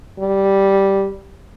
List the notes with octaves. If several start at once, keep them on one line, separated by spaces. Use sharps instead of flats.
G3